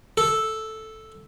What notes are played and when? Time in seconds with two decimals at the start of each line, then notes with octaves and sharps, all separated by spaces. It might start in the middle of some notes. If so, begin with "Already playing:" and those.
0.17 A4